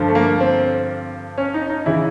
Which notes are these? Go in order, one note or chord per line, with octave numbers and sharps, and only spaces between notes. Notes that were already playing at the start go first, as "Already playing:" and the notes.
Already playing: G2 D3 F3
A3
A#3
C4
C#4
D#4
D#4
C#3 E3 E4